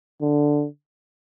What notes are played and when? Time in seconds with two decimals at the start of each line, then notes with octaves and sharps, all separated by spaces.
0.21 D3